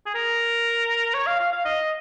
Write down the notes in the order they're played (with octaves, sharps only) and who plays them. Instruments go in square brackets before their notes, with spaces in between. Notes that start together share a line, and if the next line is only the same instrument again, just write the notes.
[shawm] G#4
A#4
C#5
F5
F5
F5
D#5